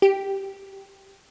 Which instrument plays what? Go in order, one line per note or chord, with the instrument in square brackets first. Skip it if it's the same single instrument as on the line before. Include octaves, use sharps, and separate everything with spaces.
[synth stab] G4